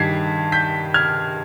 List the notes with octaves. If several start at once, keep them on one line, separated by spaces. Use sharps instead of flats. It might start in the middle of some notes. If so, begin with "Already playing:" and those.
Already playing: G2 D#3 G#6 B6 C7
G6 B6
F6 G#6